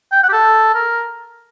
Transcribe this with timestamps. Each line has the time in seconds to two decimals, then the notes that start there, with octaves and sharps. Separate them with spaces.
0.12 G5
0.23 F#5
0.29 G4
0.32 A4
0.74 A#4